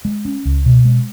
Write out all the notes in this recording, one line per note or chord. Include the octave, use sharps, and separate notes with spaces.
G#3
C#4
C#2
B2
G#3